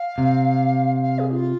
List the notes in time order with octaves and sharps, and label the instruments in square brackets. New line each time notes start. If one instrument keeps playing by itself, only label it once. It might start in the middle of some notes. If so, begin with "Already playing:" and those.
Already playing: [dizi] F5
[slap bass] C3
[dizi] F5
G#4
E4
F4